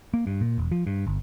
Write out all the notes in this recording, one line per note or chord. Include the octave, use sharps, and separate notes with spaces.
A#3
G2
A#2
E1
F3
G2
G1